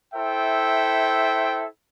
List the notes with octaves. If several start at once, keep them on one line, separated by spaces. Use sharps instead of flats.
E4 A4 C5 E5 G5